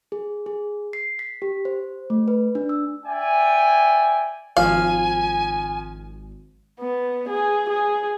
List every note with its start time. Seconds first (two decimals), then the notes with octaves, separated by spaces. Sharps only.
0.12 G#4
0.46 G#4
0.93 C7
1.19 B6
1.42 G4
1.65 C5
2.10 A3
2.28 B4
2.55 D4
2.69 E6
3.06 D5 E5 G5 G#5
4.57 G#1 F3 F5 G#5
6.80 B3
7.29 G#4
7.69 G#4